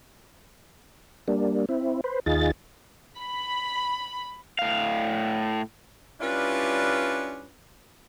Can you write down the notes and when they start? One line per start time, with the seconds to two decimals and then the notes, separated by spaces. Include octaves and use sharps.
1.28 G3 A#3 D4
1.69 C4 E4
2.04 B4 C5
2.26 D#2 D#4 F4 G#4 A6
3.20 B5
4.59 A2 F5
6.21 G3 C#4 D4 E4 F4 B4